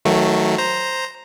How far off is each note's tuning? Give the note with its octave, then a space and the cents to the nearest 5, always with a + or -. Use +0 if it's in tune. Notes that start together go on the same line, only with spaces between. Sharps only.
D#3 +35 F#3 +0 A3 +0
C5 +0 A#5 +0